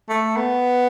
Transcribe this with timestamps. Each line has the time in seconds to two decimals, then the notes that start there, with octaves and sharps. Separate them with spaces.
0.09 A3
0.37 B3